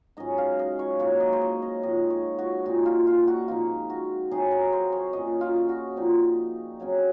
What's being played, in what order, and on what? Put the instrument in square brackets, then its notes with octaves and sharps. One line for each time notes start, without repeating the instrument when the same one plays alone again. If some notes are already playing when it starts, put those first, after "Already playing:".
[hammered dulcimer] G#2 F#3 C#4 D#5
F5
D#5
C#5
G#2 F#3 A#3 D#4 C#5
D#5
C5
C#5
D#5
G#2 F3 C4 D#5
C#5
F#4
A#2 G#3 C4 D#4 F#4
F4
F4
F#4
G#2 F3 C4 D#4 F4
F#4
C3 F#3 C4 D#4 G#4
A#4
C5
C#5
A#2 F#3 C#4 D#5
F4
F#4
A#2 F3 C4 D#4
F#2 C#3 F#3 C4